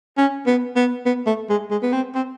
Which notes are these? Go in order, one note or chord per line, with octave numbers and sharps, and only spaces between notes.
C#4
B3
B3
B3
A3
G#3
G#3
B3
C4
C4